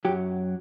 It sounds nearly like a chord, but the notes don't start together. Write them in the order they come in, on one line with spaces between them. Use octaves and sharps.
F#3 G4 F#2